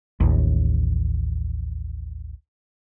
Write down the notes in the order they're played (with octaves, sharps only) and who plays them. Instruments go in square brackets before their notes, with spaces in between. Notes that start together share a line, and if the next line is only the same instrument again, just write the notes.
[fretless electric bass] A1 D#2